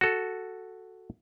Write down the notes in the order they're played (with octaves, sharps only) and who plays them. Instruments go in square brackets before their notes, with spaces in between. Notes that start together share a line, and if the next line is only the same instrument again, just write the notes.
[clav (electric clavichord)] F#4 A4